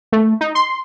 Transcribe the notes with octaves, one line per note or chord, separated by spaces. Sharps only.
A3
D#4
C6